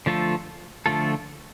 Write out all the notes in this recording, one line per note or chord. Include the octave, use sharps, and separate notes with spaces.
D3 F3 A3 F4 A4
D3 F3 A3 F4 A4